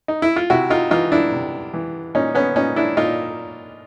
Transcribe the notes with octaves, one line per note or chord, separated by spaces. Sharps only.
D#4
E4
F4
C3 E4 F#4
D#4 F4
E3 D#4 F4
D4 E4
C3
E3
A#2 C#4 D#4
B3 C#4
A#2 C#4 D#4
D4 E4
A#2 D#4 F4